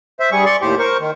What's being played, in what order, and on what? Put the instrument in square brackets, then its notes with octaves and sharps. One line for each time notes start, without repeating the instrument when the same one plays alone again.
[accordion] C5 E5
G2 G3 G#4 C#6
D5 C6 C#6
D#2 A2 G4 C5
A#4 C5 C#6
D#3